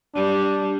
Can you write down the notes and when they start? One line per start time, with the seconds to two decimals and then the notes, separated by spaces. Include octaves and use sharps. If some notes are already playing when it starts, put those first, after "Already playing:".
0.15 G3 D4